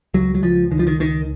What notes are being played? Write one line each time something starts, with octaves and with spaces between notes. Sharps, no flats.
C#2 F#3
F#3
C#2 F3
C#2 D#3
F3
D#3
C#2 D#3